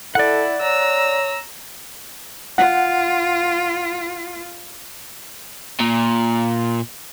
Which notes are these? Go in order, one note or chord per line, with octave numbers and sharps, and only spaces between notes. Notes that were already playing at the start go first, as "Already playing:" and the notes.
E4 A4 D5 F#5
C#5 A#5 E6
F4 F#5
A#2